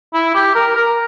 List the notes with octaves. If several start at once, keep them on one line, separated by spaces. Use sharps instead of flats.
E4
G4
A#4
A#4